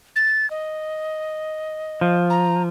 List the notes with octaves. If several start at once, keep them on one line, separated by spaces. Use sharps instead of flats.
A6
D#5
F3
A#5